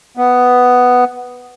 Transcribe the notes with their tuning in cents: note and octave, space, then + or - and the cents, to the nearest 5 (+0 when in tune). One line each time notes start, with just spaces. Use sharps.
B3 +5